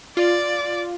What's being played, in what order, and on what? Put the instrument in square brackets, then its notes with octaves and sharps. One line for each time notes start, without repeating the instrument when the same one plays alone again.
[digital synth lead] F4 [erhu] D5